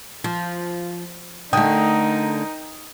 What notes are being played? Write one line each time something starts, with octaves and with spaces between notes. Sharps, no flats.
F3
D3 A3 D#4 A#4 G5 D#6